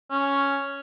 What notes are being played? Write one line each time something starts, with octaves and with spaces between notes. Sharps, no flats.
C#4